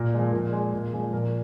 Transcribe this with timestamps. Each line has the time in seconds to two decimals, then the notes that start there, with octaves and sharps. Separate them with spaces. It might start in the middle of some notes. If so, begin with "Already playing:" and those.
Already playing: A#2 A#4
0.14 F3 G#3
0.33 A#2
0.52 G#3
0.73 A#2
0.93 F3 G#3
1.13 A#2 A#4